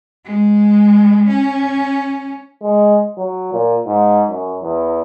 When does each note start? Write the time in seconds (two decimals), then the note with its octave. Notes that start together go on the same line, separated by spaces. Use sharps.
0.24 G#3
1.28 C#4
2.62 G#3
3.18 F#3
3.53 A#2
3.86 G#2
4.29 F#2
4.62 E2